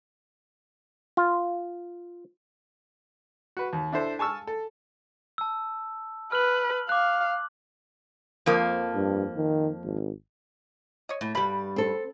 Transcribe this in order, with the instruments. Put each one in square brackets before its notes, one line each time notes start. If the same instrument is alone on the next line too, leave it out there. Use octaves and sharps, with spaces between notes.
[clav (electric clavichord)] F4
[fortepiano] F#4 B4
D#2
D4 E4 A4 C5
G#5 A5 C#6 E6 F6
A4
[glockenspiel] A5 E6
[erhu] B4 [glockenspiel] F6 F#7
[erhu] F5 [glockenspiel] D6 F#6
[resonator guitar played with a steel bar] F2 F3 A#3
[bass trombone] G2
D#3
G#1
[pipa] C#5 D#5
[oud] A2 [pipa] E3
[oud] G2 G3 [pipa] B2 B5
[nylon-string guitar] C4 A4